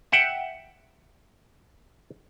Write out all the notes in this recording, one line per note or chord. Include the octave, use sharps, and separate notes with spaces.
E5 F#5 G5